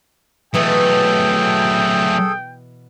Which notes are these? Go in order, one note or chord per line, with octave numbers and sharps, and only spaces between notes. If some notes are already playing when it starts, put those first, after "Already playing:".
B2 E3 F#3 A3 G#4 A4 G5